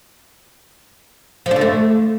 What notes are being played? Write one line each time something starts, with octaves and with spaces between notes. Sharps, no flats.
F3
D4
D3
A3